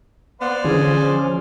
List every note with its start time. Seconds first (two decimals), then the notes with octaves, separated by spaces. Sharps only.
0.41 B3 C5 D5 F5
0.65 D3 E3 F3 C#4 G#4